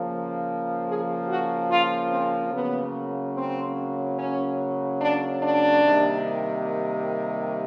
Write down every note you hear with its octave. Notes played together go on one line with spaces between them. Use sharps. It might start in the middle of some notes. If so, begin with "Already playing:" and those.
Already playing: C#3 F3 A#3
G#4
F#4
F4
C4
C#3 F#3 A#3 B3
C4
C#4
D4
D4
C3 D#3 G3 A#3